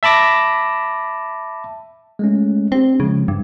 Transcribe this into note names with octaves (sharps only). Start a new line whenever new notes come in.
E5 A5 B5 D6 A#6
G#3 A3 C#4
C4 D4 G4
C#3 F3 G#3
G2